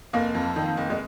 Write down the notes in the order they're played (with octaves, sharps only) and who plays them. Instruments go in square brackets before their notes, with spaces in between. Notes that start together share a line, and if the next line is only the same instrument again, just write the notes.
[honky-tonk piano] F1 A#3
F2
D#3
F1
G#3